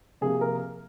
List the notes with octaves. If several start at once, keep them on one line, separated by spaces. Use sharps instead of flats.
C3 F3 A#3 G#4
A#4